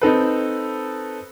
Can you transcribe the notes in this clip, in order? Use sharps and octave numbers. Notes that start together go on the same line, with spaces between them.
C4 D#4 A4 B4